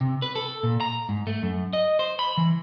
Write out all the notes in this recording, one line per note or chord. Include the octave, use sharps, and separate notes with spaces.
C3
B4
A4
A#2
A#5
G#2
A3
F#2
D#5
C5
B5
E3